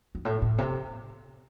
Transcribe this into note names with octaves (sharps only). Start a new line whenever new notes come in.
G2
A2
A2
C3